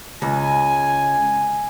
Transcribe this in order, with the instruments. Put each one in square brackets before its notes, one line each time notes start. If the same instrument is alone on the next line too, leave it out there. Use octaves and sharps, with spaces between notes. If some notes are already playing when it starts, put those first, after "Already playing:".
[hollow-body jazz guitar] C#2 [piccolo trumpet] G#5